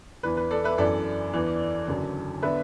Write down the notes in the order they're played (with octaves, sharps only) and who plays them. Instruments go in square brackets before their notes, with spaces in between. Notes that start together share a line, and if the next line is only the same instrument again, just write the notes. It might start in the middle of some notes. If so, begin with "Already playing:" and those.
[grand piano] E2 E3 D4 B4
B4
A4 D5
B4 E5
F#2 E3 B3 D4 A4 D5
E2 E3 D4
F#1 F#2 D3 F#3
D3 B3 D4 B4 E5